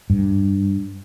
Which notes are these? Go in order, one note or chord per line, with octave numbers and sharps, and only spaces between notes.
G2